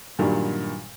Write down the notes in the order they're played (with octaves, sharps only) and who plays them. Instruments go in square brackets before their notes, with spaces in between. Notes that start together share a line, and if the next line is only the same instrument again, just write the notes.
[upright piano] G2 A#2 D#3 F#3 G3